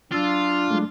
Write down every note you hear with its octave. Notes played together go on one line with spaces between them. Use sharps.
F#3 D4 F4 E6 A6
F#3 G#3 A3